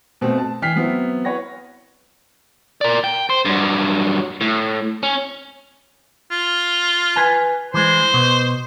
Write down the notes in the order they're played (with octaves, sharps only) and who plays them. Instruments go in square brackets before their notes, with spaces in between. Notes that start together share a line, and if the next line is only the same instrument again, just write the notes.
[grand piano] B2 A3 C4
A5
E3 G5 F6 B6 C7
F#3 B3 C4 E4
B4 C#5 F#5 A#6
[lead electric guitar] A#4 D5
G5
C5
G2 F#3
A2
C#4
[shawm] F4
[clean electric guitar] B4 G#5
[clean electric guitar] E3 G#3 [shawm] C5
[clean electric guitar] B2